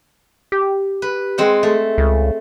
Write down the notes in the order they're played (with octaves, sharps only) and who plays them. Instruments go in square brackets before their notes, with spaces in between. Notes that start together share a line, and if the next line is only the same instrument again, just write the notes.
[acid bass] G4
[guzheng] B4
G#3 C4 F#5
A3
[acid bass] C#2